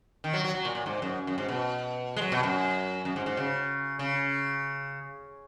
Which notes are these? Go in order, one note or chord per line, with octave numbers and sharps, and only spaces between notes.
D#3
F#3
F#3
F#3
A#2
A#2
G#2
F#2
F#2
G#2
B2
G#3
F#3
B2
F#2
F#2
G#2
G#2
C#3
C#3